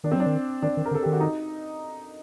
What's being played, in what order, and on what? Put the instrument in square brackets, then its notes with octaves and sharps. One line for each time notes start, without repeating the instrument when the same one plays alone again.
[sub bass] D#3 [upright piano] D4
[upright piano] C4
[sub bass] F#3 [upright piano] D4
[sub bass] D#3
[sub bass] D#3 [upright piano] D4
[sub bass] D#3
[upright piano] A#4
[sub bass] D3
[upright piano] A4
[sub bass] D#3 [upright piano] G4
[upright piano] F#4
D#4